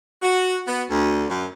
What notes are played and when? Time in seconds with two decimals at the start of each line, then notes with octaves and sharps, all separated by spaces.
0.21 F#4
0.67 B3
0.90 D2
1.28 F#2